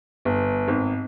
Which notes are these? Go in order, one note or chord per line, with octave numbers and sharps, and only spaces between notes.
G1
G#1